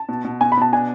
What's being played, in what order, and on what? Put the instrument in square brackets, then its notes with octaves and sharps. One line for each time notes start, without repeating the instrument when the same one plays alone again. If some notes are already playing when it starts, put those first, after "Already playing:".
Already playing: [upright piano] A5
[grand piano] B2
B2
[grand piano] B2 [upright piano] G#5
[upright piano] B5
[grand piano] B2 [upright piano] A5
[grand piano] D4 [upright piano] G#5